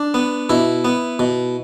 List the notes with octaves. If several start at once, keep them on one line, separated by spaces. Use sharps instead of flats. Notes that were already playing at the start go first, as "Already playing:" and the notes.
Already playing: D4
B3
B2 E4
B3
B2